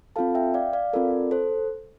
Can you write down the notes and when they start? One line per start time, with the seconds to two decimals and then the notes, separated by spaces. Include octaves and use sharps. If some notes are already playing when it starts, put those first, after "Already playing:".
0.16 C4 F4 A4 F5 A5
0.35 E5 G5
0.54 D5 F5
0.73 D5 F5
0.93 C4 F4 A4 A#4 D5
1.31 A4 C5